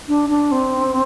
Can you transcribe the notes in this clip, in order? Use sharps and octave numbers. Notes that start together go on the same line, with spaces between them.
D4
D4
C4